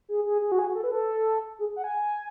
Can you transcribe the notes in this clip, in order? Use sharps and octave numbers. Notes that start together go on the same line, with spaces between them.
G#4
G#4
G#4
F#4
G#4
F#4
A4
B4
A4
G#4
F#5
G#5